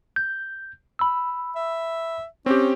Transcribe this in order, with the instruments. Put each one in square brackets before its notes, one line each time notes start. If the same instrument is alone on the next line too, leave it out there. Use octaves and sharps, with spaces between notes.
[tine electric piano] G6
B5 E6
[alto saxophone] E5
[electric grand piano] C4 G4 [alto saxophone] C#4